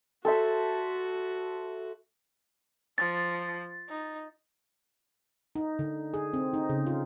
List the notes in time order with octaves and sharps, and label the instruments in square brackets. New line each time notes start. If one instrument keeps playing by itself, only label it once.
[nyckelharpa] F#4 [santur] A4 C5 E5
[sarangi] F3 [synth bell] A6
[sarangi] D#4
[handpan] D#4
D3
G#4
C4
D#4
C#3
F4